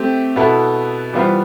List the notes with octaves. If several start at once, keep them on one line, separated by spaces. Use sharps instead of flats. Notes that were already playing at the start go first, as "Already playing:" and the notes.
Already playing: A3 C4 G4
B2 B3 E4 A4
E3 G3 B3 F4 C5